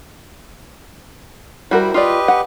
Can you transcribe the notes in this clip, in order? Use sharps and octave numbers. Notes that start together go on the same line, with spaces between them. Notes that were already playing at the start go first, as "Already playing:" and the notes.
G3 E4 F#4 A#4 C5
F4 G4 B4 D5 D#5
F#5